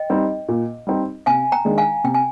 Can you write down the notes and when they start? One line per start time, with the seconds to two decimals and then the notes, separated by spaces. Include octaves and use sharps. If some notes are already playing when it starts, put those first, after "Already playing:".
Already playing: D#5 G5
0.10 G3 C4 D#4
0.49 A#2
0.87 G3 C4 D#4
1.26 C3 F5 G#5
1.52 G5 A#5
1.65 D#3 G#3 D4
1.78 F5 G#5
2.04 C3 G5
2.14 G#5